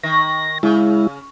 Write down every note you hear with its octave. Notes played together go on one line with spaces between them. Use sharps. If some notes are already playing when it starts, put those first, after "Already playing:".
D#3 A#6
C#3 G#3 E4